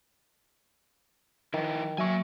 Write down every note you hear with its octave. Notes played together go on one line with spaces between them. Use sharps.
D#3 F3 E4
F#3 A#3 E5 G#5 C#6